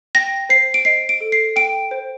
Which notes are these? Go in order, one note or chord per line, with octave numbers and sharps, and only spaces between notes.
G5 A#6
C5 C7
D7
D#5 C7
D7
A4
C7
G5 D7
C5